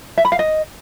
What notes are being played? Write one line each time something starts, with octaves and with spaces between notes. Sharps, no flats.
E5
B5
F5
D#5